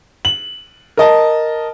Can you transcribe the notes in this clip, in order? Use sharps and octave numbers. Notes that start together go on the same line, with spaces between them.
F#7
A#4 D#5 A5